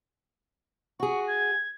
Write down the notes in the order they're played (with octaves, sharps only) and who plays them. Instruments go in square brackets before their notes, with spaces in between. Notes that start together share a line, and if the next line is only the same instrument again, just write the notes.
[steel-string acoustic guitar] F#4 G#4 [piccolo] C#6
[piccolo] G#6